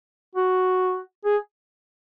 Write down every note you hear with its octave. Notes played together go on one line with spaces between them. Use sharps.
F#4
G#4